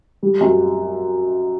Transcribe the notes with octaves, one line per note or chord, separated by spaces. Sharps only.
G3
F#2